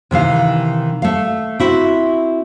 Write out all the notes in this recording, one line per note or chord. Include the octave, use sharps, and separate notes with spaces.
C3 D#3 E3 F5
A3 F5
C4 E4 F#4